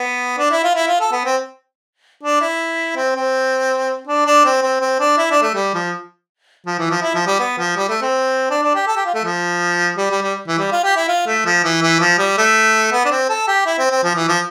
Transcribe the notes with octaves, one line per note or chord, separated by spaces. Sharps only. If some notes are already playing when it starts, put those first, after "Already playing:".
Already playing: B3
D4
E4
F4
E4
F4
A4
B3
C4
D4
E4
C4
C4
D4
D4
C4
C4
C4
D4
E4
D4
A3
G3
F3
F3
E3
F3
E4
F3
G3
B3
F3
G3
A3
C4
D4
D4
G4
A4
G4
F4
A3
F3
G3
G3
G3
E3
G3
F4
G4
E4
F4
A3
F3
E3
E3
F3
G3
A3
B3
D4
C4
A4
G4
E4
C4
C4
F3
E3
F3